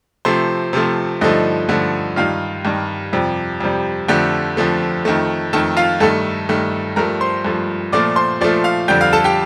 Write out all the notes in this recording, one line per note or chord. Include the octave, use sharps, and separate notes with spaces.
C3 F3 A3 C5
C3 F3 A3
G2 D3 F3 A3 D#4 D#5
G2 D3 F3 A3
G2 D#3 G3 F4 F5
G2 D#3 G3
F2 C3 G3
F2 C3 G3
F2 D3 F3 A3 G4 G5
F2 D3 F3 A3
F2 D#3 A3
F2 D#3 A3 A4 A5
F4 F5
G2 D#3 A3 A4 A5
G2 D#3 A3
G2 F3 A3 A#4 A#5
C5 C6
G2 F3 A3
A#2 F3 A3 D5 D6
C5 C6
A#2 F3 A3 D5 D6
F5 F6
F2 D3 G3 G5 G6
F5 F6
A4 A5
G4 G5